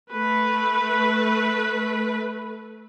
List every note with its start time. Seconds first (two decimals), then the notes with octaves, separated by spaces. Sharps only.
0.11 A3 B4